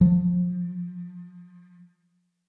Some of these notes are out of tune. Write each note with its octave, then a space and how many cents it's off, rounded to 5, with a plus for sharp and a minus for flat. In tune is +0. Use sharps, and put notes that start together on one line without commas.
F3 +30